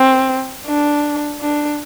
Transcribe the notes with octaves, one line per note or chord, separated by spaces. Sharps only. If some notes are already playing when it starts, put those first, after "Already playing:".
Already playing: C4
D4
D4